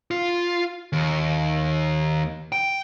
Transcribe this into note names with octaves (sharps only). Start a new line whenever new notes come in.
F4
D#2
G5